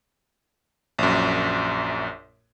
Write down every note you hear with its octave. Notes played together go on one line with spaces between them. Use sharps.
A#1 F#2